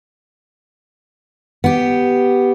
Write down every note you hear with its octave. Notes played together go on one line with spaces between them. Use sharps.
B3 G4